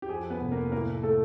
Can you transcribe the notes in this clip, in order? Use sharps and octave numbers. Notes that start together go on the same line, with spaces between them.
G4
F2 G#4
B3 B4
F1
A#3 A#4
A2 A#3 A#4
A3 A4